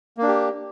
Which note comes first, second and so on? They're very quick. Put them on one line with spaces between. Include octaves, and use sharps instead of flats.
A#3 D4 G4